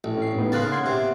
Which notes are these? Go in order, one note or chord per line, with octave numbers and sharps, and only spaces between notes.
A1
C#4 C7
A2 B3 D#4
C#3 A#3 C6 F#6 A6
F#5 C6 G#6
C3